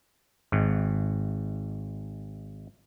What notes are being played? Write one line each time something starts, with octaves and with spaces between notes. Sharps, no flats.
G#1 G#2